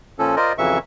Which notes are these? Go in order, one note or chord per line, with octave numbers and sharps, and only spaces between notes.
A#2 F3 C#4 A4
F4 A#4 C5 D5 D#5
F2 C#3 E3 F#3 E5 C#6